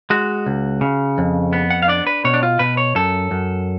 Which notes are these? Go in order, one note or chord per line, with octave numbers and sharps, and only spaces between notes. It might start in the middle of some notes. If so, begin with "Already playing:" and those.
G#3 F#4
C#2
C#3
F2
B3
F#5
F5
D4 D5
B4
B2 C#5
D4
F4
B2 B4
C#5
F#2 A4
F#2